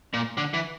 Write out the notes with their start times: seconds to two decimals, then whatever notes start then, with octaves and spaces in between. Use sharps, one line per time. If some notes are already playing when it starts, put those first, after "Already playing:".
0.14 A#2
0.38 D3
0.54 E3